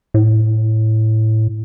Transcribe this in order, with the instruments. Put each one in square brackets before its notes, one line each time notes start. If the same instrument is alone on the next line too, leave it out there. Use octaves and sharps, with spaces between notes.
[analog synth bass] A2